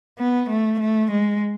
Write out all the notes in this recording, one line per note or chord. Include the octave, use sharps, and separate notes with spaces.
B3
A3
A3
G#3